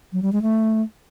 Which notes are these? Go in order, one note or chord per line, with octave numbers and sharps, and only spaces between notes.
F#3
G3
G#3
A3